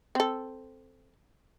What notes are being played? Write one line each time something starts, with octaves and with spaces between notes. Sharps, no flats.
C4 A4